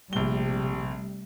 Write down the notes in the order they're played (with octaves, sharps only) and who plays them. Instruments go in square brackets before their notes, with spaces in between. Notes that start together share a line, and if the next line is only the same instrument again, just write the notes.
[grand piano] A#1 G7 [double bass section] C3 G3 A3